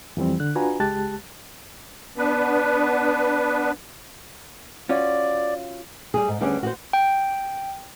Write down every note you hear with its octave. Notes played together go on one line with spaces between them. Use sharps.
F2 E3 G3 C4
D3 F#6
D4 F4 F#4 B4 G#5 A#5
C#2 G#3 G4 A5 F#6 A6
B3 D4 B4
C#4 F4 F#4 D5
G3 G#4
G#2
D2 G3 B3 C#4 D4 G#4
F#4 G4 C5
G5